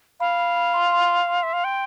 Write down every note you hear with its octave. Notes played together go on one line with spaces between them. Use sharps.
F5 B5
B5
B5
C6
C6
C6
E5
F5
G5